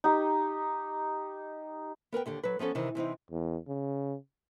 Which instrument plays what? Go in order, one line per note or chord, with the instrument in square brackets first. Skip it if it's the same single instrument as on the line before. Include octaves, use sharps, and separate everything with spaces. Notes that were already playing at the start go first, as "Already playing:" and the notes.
[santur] D#4 G4
[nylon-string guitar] B3 A#4 B4 G5
D#2 D3 G4
F#3 B4
F3 B3 C#4 A4
C3 D#3 E3
C3 E3 C4 D#4
[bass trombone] E2
C#3